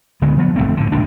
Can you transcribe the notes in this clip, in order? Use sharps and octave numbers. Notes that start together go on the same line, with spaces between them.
C#2 D3 G#3 B3
F3 F#3 B3
F1 G2 A3 C4
A2 D3
D#1 C#2 A2 D4